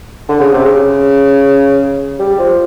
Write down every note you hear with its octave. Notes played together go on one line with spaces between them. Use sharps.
D3
C#3
C3
C#3
G3
F3